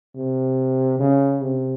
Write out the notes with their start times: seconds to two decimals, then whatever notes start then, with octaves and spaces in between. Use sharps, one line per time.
0.15 C3
0.99 C#3
1.42 C3